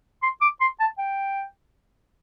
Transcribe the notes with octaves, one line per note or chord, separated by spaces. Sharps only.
C6
D6
C6
A5
G5